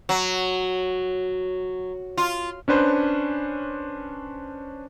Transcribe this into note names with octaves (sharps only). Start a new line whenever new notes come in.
F#3
F4
C#4 D4 B4 C5